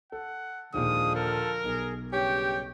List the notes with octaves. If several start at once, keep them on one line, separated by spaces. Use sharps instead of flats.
A4 F#5
D#2 A#2 D3 F3 G#3 D#6
A4 A#4
B1 G#4
G2 C#3 G4 C#5 G5